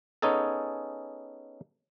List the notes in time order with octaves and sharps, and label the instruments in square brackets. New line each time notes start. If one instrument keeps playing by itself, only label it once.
[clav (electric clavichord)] B3 C#4 D#4 G#4 A4